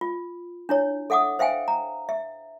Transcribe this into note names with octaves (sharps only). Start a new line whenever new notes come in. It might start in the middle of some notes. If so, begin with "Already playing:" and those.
F4
D4 E4 C#5
A4 E5 F#5 D6 D#6
C5 E5 F5 G5 G#5
A#5
E5